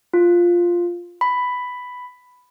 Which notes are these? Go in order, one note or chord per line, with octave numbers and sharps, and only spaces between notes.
F4
B5